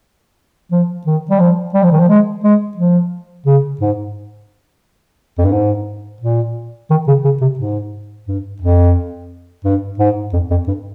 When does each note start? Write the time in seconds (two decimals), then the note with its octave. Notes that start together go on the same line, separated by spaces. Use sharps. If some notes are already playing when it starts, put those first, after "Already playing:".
0.72 F3
1.06 D#3
1.30 G3
1.39 F3
1.74 G3
1.83 F3
1.92 D#3
2.00 F3
2.09 G#3
2.44 G#3
2.77 F3
3.46 C#3
3.81 G#2
5.38 F2
5.45 G2
5.52 G#2
6.21 A#2
6.90 D#3
7.07 C#3
7.24 C#3
7.41 C3
7.59 G#2
8.28 G2
8.62 F2
9.65 G2
9.99 G#2
10.33 F2
10.50 F2
10.67 G2